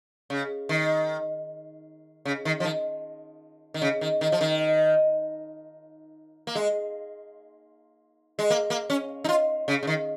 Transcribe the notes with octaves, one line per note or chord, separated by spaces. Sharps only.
C#3
D#3
C#3
D#3
F3
D#3
D#3
C#3
D#3
D#3
F3
D#3
A#3
G#3
G#3
A#3
A#3
C#4
D#4
F4
C#3
C#3
D#3